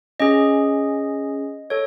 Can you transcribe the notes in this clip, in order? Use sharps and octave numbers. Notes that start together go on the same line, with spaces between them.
C#4 G#4 D#5
A4 C#5